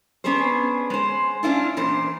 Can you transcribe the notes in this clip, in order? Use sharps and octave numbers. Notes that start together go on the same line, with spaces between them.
B3 C#4 D4 G#4 C5
G#3 C5
C#4 D4 E4 F4
E2 A#2 C5